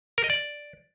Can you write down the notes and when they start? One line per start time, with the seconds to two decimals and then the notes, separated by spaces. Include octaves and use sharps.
0.18 A#4
0.24 D#5
0.30 D5